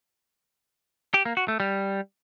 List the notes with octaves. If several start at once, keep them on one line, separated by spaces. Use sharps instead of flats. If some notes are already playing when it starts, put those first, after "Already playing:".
G4
A#3
F#4
A3
G3